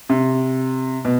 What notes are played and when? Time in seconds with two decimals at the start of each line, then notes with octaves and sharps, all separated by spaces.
0.09 C3
1.05 B2